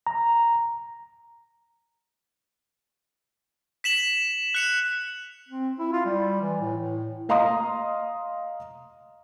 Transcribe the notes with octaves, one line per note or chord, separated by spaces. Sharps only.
A#5
B6 E7 F#7
F#6 C#7 F7
C4
E4
F4
G3
E3
A2
A2
D#5 F5 A#5 C6 D#6